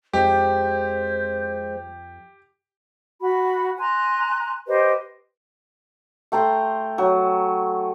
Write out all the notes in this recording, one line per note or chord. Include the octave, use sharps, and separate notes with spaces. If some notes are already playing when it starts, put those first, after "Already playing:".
F2 G#3 G4 C5
F#4 B5
G#5 A#5 C6 F#6
G4 B4 C5 D#5
A3 G5 A#5 C6
F#3